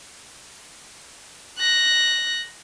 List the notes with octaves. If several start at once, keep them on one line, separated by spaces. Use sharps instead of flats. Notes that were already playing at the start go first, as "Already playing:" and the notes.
F#6 A#6